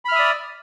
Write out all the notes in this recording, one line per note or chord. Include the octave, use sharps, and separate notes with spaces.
D5 E5 B5 D#6 F6